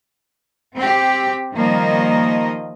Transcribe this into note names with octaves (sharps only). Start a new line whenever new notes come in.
C4 G4
D#3 F3 G3 A#3 D#5